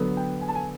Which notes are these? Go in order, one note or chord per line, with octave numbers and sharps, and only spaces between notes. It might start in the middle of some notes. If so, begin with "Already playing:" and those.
Already playing: D3 F#3 B3
G5
G#5
A5
G#5